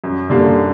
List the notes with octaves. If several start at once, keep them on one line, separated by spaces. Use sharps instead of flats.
F#2
D3 G3 A#3